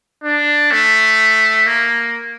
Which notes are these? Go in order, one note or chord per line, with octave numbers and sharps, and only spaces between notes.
D4
A3
A#3